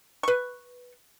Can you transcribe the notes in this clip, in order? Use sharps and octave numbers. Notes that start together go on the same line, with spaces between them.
B4 C#6